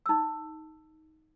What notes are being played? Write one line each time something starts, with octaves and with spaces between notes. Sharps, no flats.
D#4 E6